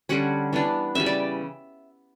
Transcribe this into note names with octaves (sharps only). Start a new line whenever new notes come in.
D3 G3 C#4 F#5
E3 B3 D4
C#3 E3 G3 E5
D5